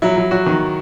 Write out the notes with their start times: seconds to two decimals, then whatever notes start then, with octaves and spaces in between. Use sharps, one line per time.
0.02 F#3 E4
0.17 F#3
0.31 F#3 F#4
0.46 D#3